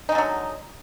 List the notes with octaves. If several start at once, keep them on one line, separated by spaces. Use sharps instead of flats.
D3 F#3 G#3 D#4